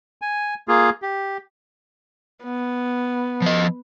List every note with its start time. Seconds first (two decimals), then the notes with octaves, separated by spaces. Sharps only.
0.22 G#5
0.68 A#3 F4 G#4
1.02 G4
2.44 B3
3.42 F3 D#5